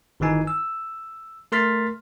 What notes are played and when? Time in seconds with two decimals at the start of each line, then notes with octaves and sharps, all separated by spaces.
0.20 G1 D#3 E3 D#4 G#5
0.47 E6
1.52 A3 A#4 C6 F6 A6 B6